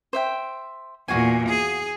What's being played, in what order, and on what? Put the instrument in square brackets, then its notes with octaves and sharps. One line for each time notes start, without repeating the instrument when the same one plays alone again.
[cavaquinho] C5 E5 G5
[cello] E2 A#2 [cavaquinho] F#4 F5 G#5
[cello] G#4